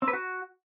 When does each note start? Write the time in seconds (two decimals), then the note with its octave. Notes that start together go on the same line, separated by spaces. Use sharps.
0.02 C4
0.08 B4
0.13 F#4